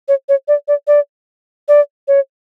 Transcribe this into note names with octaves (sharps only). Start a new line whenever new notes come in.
C#5
C#5
D5
D5
D5
D5
C#5